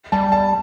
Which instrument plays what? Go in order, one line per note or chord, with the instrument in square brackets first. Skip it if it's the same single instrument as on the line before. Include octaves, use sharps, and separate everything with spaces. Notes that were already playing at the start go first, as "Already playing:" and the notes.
[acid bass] G3 [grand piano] A5
[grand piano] A5